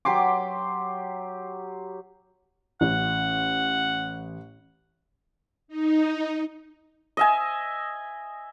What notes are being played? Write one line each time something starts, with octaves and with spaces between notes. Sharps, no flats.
F#3 G4 C6 D6
A1 F#5
D#4
D#5 E5 G#5